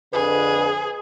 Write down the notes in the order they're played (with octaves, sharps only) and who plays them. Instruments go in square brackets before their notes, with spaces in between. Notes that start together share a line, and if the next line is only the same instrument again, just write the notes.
[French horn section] F2 D3 B4 [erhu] G#4